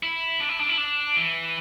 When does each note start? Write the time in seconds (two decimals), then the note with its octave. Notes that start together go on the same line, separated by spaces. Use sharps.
0.03 E4
0.40 D4
0.49 E4
0.60 D4
0.69 E4
0.78 D4
1.16 E3